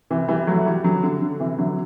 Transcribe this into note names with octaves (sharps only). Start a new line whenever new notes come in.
C3 E3
E3 G3
F#3 A3
E3 G3
D3 F#3
D3
D3
C3 E3
D3 F#3